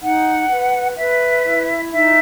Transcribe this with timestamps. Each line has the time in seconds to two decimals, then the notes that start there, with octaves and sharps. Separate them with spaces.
0.02 D#4 F#5
0.49 B4
0.97 B4 E5
1.44 E4
1.92 D#4 E5